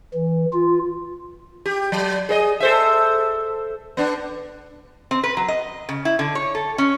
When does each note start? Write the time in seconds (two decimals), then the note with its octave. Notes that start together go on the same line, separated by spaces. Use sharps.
0.14 E3
0.53 F4
1.66 G4
1.92 F#3
2.29 G#4 A#4 D#5
2.60 A4 C5 E5
3.97 B3 D4
5.11 C4
5.23 B4
5.37 F#3
5.48 D#5
5.89 C#3
6.05 E4
6.19 D3
6.35 C#5
6.55 A4
6.78 C#4